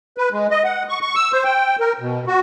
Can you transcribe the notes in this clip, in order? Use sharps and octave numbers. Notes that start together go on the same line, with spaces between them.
B4
G#3
D#5
F#5
C#6
C#6
E6
C5
G5
A#4
B2
F#4